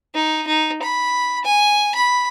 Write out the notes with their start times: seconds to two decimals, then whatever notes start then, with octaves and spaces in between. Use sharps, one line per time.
0.14 D#4
0.47 D#4
0.82 B5
1.45 G#5
1.95 B5